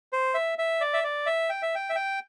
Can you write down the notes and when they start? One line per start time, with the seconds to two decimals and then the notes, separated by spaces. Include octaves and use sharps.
0.13 C5
0.34 E5
0.58 E5
0.81 D5
0.93 E5
1.04 D5
1.26 E5
1.49 G5
1.62 E5
1.75 G5
1.90 E5
1.95 G5